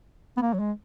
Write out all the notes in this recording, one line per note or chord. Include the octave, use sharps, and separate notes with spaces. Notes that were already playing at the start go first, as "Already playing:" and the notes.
B3
A#3
F#3
G#3